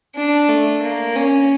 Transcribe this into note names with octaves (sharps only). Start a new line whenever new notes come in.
D4
A3
A#3
C#4